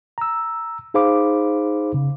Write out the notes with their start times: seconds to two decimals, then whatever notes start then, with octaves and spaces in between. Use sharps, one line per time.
0.18 A#5 E6
0.94 D#4 G#4 C5 F5 B5 D6
1.94 C#3